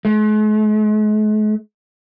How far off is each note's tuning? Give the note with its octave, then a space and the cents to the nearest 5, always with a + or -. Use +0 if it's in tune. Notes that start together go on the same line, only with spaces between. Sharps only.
G#3 +45